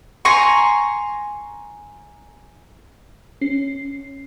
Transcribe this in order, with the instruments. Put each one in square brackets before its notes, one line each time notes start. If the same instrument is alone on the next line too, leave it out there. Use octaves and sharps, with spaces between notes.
[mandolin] G#5 A#5 C6 C#6
[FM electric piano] C#4 C7